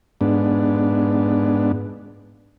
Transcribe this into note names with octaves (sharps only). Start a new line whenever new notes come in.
G#2 B3 D4